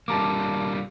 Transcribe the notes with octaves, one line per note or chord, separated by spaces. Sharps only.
D3 G3 A#3 A5 A#5 D6